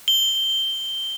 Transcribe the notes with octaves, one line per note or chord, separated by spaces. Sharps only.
G7